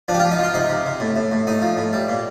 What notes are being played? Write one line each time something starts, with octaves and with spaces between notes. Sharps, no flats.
F3 D4
G4
F3 F4
D#4
F3 F4
C3 D#4
C3
C3
A2
A2
A2
A2 D#4
F3
A2
G3
A#2